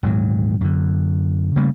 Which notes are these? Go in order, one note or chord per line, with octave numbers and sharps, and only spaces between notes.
D#1 D2 G#2 F#3
F#2 D3
C#3 G3 A3 A#3